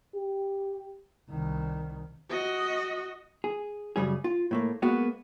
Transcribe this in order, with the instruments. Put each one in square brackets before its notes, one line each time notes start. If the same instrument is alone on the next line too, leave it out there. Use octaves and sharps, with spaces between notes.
[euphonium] G4
[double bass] C2 D#3
[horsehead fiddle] F#4 D#5
[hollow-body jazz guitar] G#4
F#2 C#3 G3 G#4
F4
A2 A3 A#3
G#3 A#3 B3 F#4